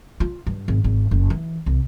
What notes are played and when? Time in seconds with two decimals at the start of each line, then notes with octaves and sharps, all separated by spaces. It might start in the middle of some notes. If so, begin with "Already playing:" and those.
0.20 F4
0.47 G2
0.68 G#1
0.84 G#1
1.11 F#1
1.30 E3
1.66 C2